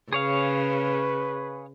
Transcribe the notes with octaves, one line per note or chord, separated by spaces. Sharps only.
C#3 G#4 B4 C#5 F5